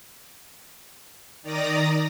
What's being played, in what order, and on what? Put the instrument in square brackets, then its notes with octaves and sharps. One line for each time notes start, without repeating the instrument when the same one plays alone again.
[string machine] D#3 D5 A#5 D#6 A#6